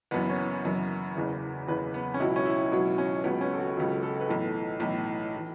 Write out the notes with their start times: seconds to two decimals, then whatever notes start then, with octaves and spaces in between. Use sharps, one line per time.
0.11 F#1 F#2 E3 B3
0.29 C#4
0.64 F#1 F#2 E3
1.15 F#1 E2 C#3 E3
1.68 F#1 E2 C#3 E3 B4
1.94 B3
2.14 C#4
2.19 C#2 B2 F#3 E4
2.36 C#4
2.46 E4
2.72 C#2 B2 F#3
2.98 C#4
3.24 C#2 C#3 F#3 B3
3.41 C#4
3.53 A4
3.59 F#4
3.76 C#2 C#3 F#3 A4
4.03 A4
4.20 B4
4.28 B1 A2 E3 A4
4.80 B1 A2 E3
5.37 E3